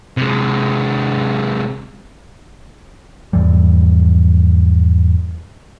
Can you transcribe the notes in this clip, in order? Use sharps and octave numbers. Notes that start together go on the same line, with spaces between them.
C3 G#3
E2 G#2 E3 G3